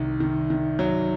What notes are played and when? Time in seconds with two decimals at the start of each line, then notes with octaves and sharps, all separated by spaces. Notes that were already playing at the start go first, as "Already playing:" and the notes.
Already playing: C2 D#3
0.20 D#3
0.50 D#3
0.79 F#3